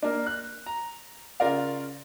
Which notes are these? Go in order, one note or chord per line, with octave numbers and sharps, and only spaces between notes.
A#3 D4
F#6
A#5
C#3 F4 A#4 D5 F5